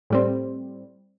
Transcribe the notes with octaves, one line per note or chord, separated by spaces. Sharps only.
A2 G3 C4